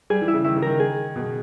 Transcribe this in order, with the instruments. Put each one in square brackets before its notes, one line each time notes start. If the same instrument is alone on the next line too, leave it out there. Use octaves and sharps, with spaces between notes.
[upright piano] G3 [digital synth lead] G#4
[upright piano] E3
[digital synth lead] E4
[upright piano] C#3
[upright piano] D#3 [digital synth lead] E4
[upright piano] C#3
[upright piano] D#3 [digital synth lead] A#4
[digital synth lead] G#4
[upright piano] B2